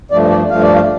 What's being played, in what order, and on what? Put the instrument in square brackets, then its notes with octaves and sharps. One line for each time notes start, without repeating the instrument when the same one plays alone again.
[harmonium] G2 F3 A3 D5
D5
G2 F3 A3 F5
D5
F5